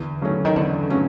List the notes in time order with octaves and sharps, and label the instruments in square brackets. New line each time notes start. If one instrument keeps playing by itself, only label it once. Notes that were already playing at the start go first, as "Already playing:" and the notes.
Already playing: [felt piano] E2 [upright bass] D3
[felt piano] C#3 F#3 A3 C#4
[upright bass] D#3
[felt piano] E2 [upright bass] D3
[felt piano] C#3 F#3 A3 C#4